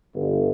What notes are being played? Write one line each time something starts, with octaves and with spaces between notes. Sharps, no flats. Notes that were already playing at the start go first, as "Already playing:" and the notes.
G1